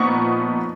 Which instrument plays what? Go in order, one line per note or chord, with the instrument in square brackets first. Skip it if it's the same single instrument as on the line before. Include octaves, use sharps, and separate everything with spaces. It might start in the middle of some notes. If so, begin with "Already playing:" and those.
Already playing: [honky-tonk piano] A#2 F3 B3 D#4 C#6